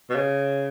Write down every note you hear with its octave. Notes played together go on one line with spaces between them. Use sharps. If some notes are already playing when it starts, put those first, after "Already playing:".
B2
C#3